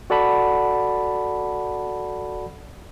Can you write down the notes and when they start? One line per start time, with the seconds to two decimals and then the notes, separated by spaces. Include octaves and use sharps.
0.10 F#4 A4 D5 F#5 A5 B5